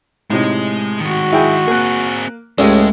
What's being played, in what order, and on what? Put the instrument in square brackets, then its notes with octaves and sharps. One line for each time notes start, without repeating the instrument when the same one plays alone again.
[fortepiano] A2 C3 D#4 [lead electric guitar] G#3
[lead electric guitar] D#3 G#3 [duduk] F#4
[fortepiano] E4 G#4 G5
[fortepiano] A#3 F#6 [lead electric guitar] C4 G#4
[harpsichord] C#2 A2 [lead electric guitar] G#3 [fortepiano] C#4 G4